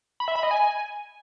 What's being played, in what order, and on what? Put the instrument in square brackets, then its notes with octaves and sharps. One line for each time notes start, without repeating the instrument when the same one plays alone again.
[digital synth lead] B5
E5
B5
D#5
G#5